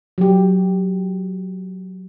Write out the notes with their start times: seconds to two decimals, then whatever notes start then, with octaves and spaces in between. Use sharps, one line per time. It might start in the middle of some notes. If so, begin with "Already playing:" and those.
0.18 F#3 G4